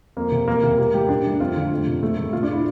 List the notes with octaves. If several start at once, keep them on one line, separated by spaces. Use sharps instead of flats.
F2 A#3
C3
E2 A#3
C3 A#3
G3 A#3
A2 G4
G3 D4
A2
F2 F4
D3
F2
C3
A3
A2
A3 F4
D4
E4